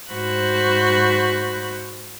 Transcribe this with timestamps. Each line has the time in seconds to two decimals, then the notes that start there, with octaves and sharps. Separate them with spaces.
0.13 G#2 F#4 C5 B5 F#6